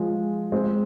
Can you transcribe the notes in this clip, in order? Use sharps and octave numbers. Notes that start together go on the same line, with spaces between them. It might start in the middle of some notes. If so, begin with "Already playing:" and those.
Already playing: F3 G#3
G#3 C4